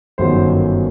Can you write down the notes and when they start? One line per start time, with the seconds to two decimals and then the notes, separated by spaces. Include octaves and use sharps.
0.18 G1 F#2 D#3 F#3 C5